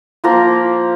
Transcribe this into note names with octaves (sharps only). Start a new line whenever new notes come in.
F3 A#3 F4 A#5